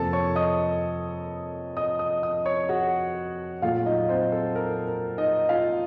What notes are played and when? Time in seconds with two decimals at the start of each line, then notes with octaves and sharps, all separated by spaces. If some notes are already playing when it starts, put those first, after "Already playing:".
Already playing: F2 C3 F3 A#3 A4 A5
0.13 C#5 C#6
0.35 D#5 D#6
1.77 D#5 D#6
1.99 D#5 D#6
2.23 D#5 D#6
2.45 C#5 C#6
2.69 F#4 F#5
3.62 A#2 F#3 A3 F4 F5
3.86 D#4 D#5
4.09 C4 C5
4.32 A4
4.55 A#4
4.87 A#4
5.18 D#4 D#5
5.49 F4 F5